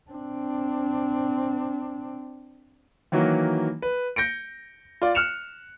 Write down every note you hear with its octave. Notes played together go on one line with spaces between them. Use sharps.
C4 D4
D#3 E3 F#3 A#3 F#4
B4
G6 A#6 C#7 D7
F4 D5
F6 F#6 C#7 E7 F7